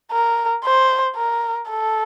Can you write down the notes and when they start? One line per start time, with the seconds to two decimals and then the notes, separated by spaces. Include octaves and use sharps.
0.11 A#4
0.64 C5
1.16 A#4
1.70 A4